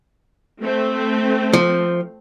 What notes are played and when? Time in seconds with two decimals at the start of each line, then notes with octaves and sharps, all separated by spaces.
0.63 A3 C4
1.53 F3